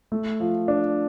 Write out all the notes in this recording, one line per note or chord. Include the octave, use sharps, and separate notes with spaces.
A3
F3
D4